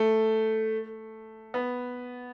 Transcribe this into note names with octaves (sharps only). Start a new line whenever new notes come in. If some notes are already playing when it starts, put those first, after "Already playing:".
Already playing: A3
B3